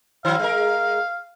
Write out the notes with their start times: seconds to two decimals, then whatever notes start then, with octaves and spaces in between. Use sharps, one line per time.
0.25 D#3 F#3 F5
0.39 G#3 A#4